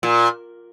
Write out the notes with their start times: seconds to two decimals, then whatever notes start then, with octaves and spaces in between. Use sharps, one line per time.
0.03 A#2